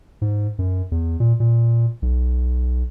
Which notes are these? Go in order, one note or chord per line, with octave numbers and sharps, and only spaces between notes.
G#2
F#2
E2
A#2
A#2
B1